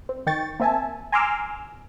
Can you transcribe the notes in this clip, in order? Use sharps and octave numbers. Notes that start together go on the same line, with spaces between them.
C4
D#3 G5 C#6 A6
A#3 C4 E5 G#5 A5
G#5 A#5 C6 D6 E6 F6